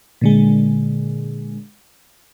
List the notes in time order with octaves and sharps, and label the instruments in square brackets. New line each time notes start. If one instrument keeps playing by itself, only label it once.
[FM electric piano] A#2 D3 G#3